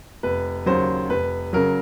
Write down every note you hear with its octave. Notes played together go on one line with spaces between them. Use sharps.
F1 B4
D#2 C#3 F#3 C5
F1 B4
C#3 F#3 A#4